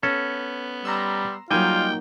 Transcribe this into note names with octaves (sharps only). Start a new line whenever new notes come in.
B3 C#4 A4
G3 A#5 C6 E6
F#3 G3 A#3 D#4 F4 G5 G#5